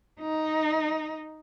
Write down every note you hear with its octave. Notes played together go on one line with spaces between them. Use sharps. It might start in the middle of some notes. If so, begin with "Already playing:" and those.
D#4